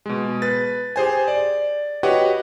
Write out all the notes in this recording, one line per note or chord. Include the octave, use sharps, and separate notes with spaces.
B2 G#3
B4 A6
G4 G#4 C5 G#5
D5
F#4 G4 B4 C#5 D#5 F#5